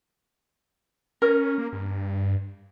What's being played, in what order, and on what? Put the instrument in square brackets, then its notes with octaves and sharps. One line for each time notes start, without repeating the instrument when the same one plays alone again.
[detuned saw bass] C#4 [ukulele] A#4
[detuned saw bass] A#3
G2